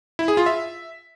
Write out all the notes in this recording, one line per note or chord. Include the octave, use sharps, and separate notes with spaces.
E4
G#4
F4
E5